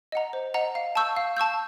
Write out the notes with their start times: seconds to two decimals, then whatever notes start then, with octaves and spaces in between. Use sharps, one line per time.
0.12 D#5 F#5 A#5
0.33 C5
0.54 D#5 F#5 A#5
0.75 F5
0.95 A5 C#6 E6 G6
1.16 F5
1.37 A5 C#6 E6 G6